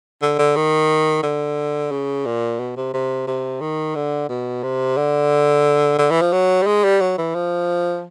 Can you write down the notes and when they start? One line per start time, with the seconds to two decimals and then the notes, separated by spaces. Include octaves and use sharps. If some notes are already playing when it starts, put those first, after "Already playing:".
0.22 D3
0.39 D3
0.56 D#3
1.23 D3
1.91 C#3
2.25 A#2
2.60 B2
2.76 C3
2.93 C3
3.27 C3
3.61 D#3
3.95 D3
4.29 B2
4.63 C3
4.97 D3
5.98 D3
6.10 E3
6.21 F3
6.32 F#3
6.62 G3
6.66 G#3
6.84 G3
7.00 F#3
7.18 E3
7.34 F3